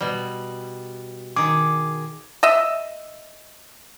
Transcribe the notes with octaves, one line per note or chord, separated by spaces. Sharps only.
B2 G3
D#3 G#4 D6
D#5 E5